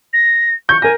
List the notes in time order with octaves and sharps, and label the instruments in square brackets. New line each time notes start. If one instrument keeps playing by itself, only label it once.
[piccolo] A#6
[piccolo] C#6 [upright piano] G6
[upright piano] A#4 A#6 [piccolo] G#5